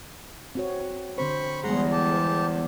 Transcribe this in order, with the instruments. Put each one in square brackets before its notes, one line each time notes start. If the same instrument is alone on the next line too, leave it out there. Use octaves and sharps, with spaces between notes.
[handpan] C4 F#4 C#5
[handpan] D3 C4 C5 [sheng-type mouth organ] B5 C#6
[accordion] E2 [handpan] G3 G#3 G#4 [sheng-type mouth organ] F#5 A#5 C6
[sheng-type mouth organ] G4 A5
[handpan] C5